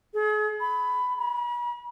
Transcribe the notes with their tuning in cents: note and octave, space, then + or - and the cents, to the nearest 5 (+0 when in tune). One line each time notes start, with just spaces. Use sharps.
G#4 +40
B5 +10
B5 -40